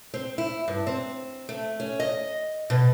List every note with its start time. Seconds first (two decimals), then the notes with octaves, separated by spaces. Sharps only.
0.14 C4
0.38 E4
0.68 G2
0.87 C4
1.49 A3
1.80 C#4
2.00 D#5
2.70 B2